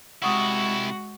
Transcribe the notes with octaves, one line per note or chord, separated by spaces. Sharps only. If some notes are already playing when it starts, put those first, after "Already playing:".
C3 G#3 E4 F#4 F#5 C#6 D#6